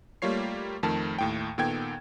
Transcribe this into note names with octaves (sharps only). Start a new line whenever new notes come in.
G3 A3 A#3 F4 C#5 C7
F2 D#3 A3 A#4 A5
D#2 A2 G5
A#2 D#3 B3 A4 G5 G#6